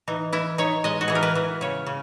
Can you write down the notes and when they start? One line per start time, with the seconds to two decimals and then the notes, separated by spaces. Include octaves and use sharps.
0.08 E3 D#4
0.32 E3 E4
0.58 D#4 C#5
0.84 G#3 D#5
1.01 F#4
1.08 E3 G#4
1.15 A#4
1.23 B4
1.35 E3
1.61 C#3 C#5
1.86 C#3